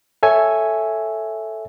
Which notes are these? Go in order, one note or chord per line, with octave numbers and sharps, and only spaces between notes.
A4 C#5 E5 G#5